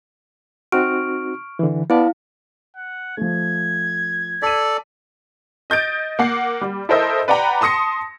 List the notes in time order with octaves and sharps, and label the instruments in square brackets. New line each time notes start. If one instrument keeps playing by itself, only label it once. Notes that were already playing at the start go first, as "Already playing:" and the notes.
[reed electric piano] C4 D#4 F#4 [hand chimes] C#6 F6 D7
[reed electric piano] D3 E3
[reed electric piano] B3 D5 A5 [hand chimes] E4 F5
[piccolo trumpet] F#5
[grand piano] F3 A3 [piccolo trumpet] G#6
[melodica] A4 D5 [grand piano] B6 D#7
[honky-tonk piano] D#5 G6 A6 D7
A#3 F#5 C7
G3
E4 A4 A#4 C5 D#5 E5
B4 D5 F#5 G5 A#5 B5
A5 C6 D#6 A#6 C#7